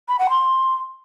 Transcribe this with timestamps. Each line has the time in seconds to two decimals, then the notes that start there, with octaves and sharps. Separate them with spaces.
0.08 B5
0.19 F#5
0.30 C6